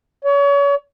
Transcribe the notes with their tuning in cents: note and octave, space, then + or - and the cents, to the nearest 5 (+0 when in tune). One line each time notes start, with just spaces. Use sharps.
C#5 +35